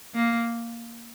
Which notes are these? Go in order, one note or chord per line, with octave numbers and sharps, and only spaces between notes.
A#3